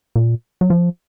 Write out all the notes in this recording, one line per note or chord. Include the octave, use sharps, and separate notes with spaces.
A#2
F#3
F3